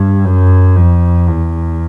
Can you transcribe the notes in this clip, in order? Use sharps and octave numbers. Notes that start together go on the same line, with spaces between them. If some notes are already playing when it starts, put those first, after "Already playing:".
Already playing: G2
F#2
F2
E2